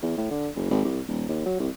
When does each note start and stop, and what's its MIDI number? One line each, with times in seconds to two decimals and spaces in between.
0.02 0.16 40
0.17 0.26 45
0.31 0.49 50
0.56 0.69 30
0.71 0.81 32
0.84 1.00 36
1.08 1.28 27
1.29 1.43 39
1.46 1.58 54
1.59 1.69 36